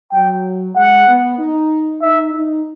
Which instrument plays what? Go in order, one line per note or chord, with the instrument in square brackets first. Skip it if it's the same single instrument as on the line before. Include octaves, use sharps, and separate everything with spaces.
[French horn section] F#3 [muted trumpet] G5
[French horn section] G#3 [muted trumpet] F#5
[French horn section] B3
D#4
[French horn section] D#4 [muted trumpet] E5
[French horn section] D#4